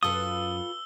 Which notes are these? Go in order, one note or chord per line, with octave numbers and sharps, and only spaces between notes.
F#2 F4 A4 B4 D#6 E6 G7